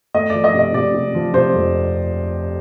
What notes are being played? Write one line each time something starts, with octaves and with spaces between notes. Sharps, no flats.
A3 D#5
F3 D5
D#5
C3
D#5
C3 D5
C3
F3
C3 C5
F2